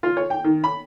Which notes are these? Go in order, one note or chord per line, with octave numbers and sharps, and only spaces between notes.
F4
C#5
G5
D#3
B5